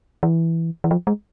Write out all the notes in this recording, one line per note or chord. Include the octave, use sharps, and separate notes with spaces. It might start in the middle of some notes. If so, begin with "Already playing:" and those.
E3
E3
F3
G#3